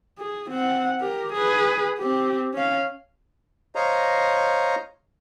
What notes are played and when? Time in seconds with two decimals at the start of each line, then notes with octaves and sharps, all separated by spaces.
0.19 G#4
0.50 C4 F#5
1.00 G4 A#4
1.32 G#4 B4
1.98 C4 G4
2.54 C#4 F5
3.75 C5 C#5 D#5 F5 A#5